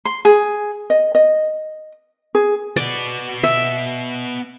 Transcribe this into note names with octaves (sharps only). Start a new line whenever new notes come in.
C6
G#4
D#5
D#5
G#4
B3 F#4 D5
E5